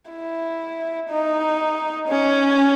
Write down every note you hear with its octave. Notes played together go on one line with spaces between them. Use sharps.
E4
D#4
C#4